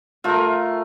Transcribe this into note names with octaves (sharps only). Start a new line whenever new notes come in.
A3 F4 A#4 E5